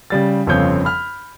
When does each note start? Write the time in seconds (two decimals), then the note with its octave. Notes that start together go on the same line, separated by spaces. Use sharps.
0.10 C#3 G3 A6
0.47 G1 F2 C#3 C4 C#5 G6
0.85 B5 F6